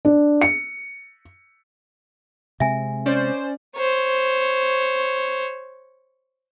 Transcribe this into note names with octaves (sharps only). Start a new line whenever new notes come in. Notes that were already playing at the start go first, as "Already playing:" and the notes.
D4
C#7
C3 G#3 C4 E5 G#5
C#4 C5 D5
C5 C#5